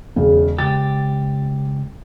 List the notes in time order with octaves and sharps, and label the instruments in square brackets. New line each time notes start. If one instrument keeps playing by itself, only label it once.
[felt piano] E1 C#3
[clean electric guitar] C#2 G4 [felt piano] A6